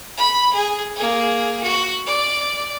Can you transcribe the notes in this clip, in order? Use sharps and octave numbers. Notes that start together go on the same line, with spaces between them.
B5
G#4
A#3 G#4
F#4
D5